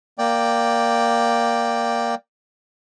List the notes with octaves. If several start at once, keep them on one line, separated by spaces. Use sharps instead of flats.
A#3 D5 G5